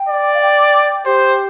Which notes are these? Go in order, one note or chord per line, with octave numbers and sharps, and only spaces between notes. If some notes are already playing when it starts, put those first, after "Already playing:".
Already playing: G5
D5
F5
G5
G4 C5